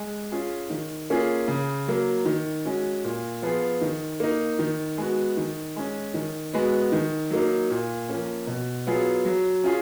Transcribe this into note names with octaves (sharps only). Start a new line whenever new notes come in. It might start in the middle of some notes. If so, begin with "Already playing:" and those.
Already playing: G#3
C#4 F4 G#4
D#3
A#3 C#4 F4 G#4
C#3
F#3 A#3
D#3
G#3 C#4 F#4
A#2
F3 B3 F4 G#4
D#3
A#3 D#4
D#3
G#3 B3 F#4
D#3
G#3 C#4
D#3
G#3 B3 F#4
D#3
F#3 A#3 D#4
A#2
F3 A#3 C#4
B2
F#3 B3 F4 G#4
F#3
C#4 F4 G#4